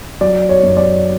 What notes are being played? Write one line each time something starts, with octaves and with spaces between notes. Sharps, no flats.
F#3 D5
C#5
F#2
D5